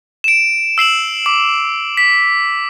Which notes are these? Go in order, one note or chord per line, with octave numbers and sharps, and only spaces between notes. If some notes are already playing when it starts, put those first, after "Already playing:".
D7 E7
E6 C7 E7 F#7
D6
B6